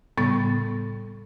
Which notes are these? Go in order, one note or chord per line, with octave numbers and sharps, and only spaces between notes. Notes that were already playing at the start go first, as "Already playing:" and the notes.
A2 C#3 G3 B3 C#6 A6